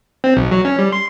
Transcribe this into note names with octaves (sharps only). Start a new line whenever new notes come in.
C4
B1
F#3
C#4
G3
C6